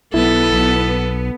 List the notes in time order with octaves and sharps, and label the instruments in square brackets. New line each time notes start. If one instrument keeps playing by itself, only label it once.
[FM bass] B1 [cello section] B3 [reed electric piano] E4 [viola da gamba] A4
[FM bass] B1